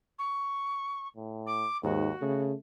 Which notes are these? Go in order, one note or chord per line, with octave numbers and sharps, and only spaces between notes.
C#6
A2
D6
D#2 G#2 F#4
C#3 A3